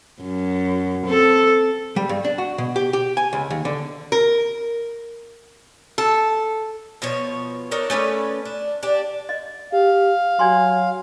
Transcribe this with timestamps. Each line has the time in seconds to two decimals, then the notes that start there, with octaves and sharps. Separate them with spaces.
0.22 F#2
1.06 C4 A4
1.96 G3
2.09 G2
2.24 D4
2.38 F#4
2.58 B2
2.76 G4
2.93 G4
3.17 G#5
3.33 C#2
3.51 D#2
3.65 D3
4.12 A#4
5.98 A4
7.02 B2 F3 C#5
7.71 D4 D#4 A#4 C#5
7.90 A3 C#4 B4 D5
8.45 D4
8.83 D4 G4
9.29 D#5
9.73 G4 F5
10.39 F#3 D5 G#5 C6